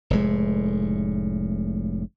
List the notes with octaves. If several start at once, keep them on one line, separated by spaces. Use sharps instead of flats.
F1 A2 G#3